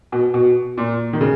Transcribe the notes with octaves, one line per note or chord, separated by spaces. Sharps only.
B2
B2
A#2
D#3
C#3